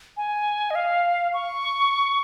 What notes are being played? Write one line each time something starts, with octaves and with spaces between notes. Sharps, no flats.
G#5
D#5
F5
C#6